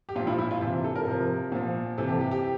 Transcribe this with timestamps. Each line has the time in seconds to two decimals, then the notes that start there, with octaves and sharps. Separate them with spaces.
0.09 G4
0.16 A#2 F4
0.20 F3
0.27 E4
0.39 E4
0.51 F4
0.61 C3 E3 F4
0.84 A4
0.96 A#4
1.07 C3 F3
1.52 A#2 F3
1.98 C3 E3 A4
2.09 G4
2.20 G4
2.31 G4